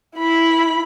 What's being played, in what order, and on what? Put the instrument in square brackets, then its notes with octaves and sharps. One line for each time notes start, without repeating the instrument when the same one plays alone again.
[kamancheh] E4 B5